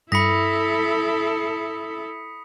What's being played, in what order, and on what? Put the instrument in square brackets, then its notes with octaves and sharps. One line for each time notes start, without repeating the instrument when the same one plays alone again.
[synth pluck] G2 [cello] E4 A4 [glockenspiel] B5 A#6 [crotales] D#6 B6 C#7